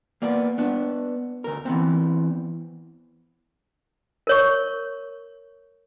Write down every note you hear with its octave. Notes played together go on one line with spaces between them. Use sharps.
A#3 B3 D5
B3 D4
D2 A#4
E3 B3 C4
A#4 C#5 C#6